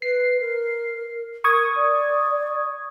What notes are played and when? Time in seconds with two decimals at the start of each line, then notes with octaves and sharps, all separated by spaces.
0.02 B4 C7
0.40 A#4
1.44 A#4 C#6 D#6 G#6
1.76 D5